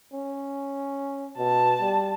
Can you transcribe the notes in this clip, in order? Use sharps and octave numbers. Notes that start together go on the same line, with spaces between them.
C#4
B2 A5
G3